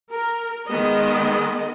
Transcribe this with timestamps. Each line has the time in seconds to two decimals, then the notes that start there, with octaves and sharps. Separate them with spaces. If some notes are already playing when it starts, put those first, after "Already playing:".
0.12 A#4
0.68 D#3 G#3 B3 D#5